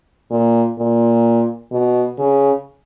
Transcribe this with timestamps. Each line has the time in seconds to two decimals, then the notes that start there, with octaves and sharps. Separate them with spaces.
0.30 A#2
0.78 A#2
1.72 B2
2.19 C#3